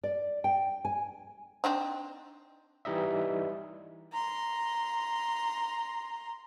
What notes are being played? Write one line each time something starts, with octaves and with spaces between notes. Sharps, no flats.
D5
G5
G#5
C4 D4 D#4
E3 G3 D#4 D#5 E5
A#5 C6